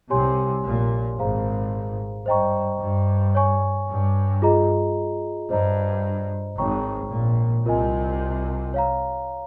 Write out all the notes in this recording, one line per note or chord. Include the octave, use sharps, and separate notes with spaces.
C2 C3 G4 C#5 G#5 C6
A#1 A#2
G#1 G#2 G#4 C5 F5 A#5
G2 C5 D#5 G5 A#5 C#6
G2
C#5 G#5 C#6
G2
F4 G#4 D#5 A#5
G2 C5 D#5 A#5
G#1 G#2 C#5 G5 A#5 C#6
A#1 A#2
C2 C3 F4 A#4 D#5 G#5
C#5 F5 A#5